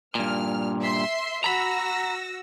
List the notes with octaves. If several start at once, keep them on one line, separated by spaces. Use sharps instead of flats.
G2 A#2 F6
E5 C6
F#4 A#5 B5 E6 A#6